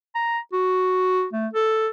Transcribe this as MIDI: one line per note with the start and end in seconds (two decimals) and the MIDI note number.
0.15 0.39 82
0.53 1.26 66
1.33 1.47 57
1.53 1.89 69